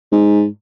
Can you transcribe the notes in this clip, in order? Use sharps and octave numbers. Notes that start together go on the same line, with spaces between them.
G#2